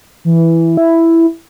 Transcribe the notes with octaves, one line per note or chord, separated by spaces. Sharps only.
E3
E4